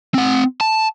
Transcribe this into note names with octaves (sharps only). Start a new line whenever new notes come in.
C4 F#5
A5